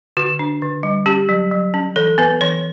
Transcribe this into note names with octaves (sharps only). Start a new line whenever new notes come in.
D3 F#4
D4
D3
G3
C#4 G4
F#3
F#3
C#4
E3 A4
B3 B4
E3 C#5